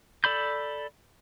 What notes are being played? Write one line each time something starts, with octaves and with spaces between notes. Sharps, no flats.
A4 D5 B5 G6